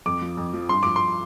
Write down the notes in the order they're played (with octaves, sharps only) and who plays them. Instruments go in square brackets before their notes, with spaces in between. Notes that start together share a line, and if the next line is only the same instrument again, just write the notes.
[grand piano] F2 D6
F3
F2
F3
G2 C6
F3 D6
C6